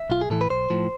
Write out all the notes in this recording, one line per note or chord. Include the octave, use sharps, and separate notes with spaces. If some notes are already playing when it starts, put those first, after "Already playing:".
Already playing: E5
B1 F4
G#4
A2 E3 A4
B4
B1 C5
A2 F3